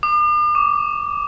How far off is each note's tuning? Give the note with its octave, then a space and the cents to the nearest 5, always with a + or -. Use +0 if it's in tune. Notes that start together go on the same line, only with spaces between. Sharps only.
D6 +45
D6 -20